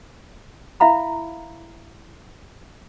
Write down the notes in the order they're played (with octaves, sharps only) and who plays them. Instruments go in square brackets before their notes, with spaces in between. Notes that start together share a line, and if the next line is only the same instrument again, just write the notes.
[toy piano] E4 E5 F5 A#5 B5